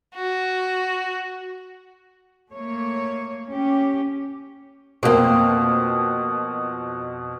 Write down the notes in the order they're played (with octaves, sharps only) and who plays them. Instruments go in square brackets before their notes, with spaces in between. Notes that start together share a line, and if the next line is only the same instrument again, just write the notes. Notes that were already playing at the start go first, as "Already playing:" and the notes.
[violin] F#4
[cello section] A3 A#3 C#5
C#4 G4
[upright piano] F2 B2 [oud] A#3 C4